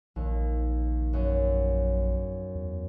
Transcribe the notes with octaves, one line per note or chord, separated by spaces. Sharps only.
A#1 D#2
F#2
E2